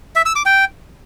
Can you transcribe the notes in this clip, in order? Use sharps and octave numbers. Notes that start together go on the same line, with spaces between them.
E5
E6
D6
G5